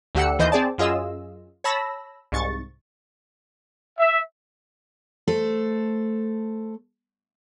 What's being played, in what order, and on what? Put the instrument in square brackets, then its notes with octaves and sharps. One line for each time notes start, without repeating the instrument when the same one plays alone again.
[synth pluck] D2 D3 G4 F#5 E6 C#7
D#2 E3 C5 D#5 G6
C4 G#4 D5 A5
F#2 F4 G#4 D#5 E6
C#5 A5 B5 E6 A#6
C2 G#2 C#6 A6
[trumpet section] E5
[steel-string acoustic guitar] A3 A4 C5